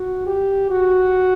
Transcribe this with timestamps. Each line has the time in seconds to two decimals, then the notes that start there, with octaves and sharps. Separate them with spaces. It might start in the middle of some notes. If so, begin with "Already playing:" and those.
Already playing: F#4
0.26 G4
0.71 F#4